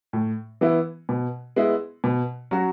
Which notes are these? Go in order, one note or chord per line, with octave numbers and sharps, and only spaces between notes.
A2
E3 B3 E4
B2
G#3 B3 E4
B2
F#3 C#4 F#4